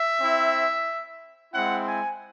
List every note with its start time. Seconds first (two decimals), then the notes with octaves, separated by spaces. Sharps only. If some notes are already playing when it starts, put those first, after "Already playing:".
Already playing: E5
0.19 C4 E4
1.53 G#3 C4 E4 F#5
1.87 G#5